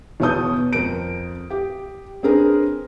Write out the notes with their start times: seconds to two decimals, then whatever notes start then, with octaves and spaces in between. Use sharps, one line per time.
0.20 E2 B2 C#5 A5 D#6 G6
0.73 F2 A#4 D7
1.50 G4
2.23 C4 D4 G#4 A#4 B4